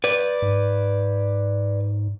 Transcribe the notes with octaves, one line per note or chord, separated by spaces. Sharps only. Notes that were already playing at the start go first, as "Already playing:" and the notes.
B4 D5
G#2